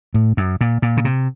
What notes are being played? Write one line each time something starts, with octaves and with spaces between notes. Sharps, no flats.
A2
F#2
A#2
A#2
C#3
C3